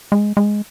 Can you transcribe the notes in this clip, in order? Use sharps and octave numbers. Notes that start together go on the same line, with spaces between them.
G#3
G#3